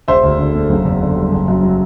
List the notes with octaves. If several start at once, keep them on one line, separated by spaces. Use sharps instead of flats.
E1 C5 E5
D2
D3
A3
F#1
E2
D3
G3
F#1
F#2
F#3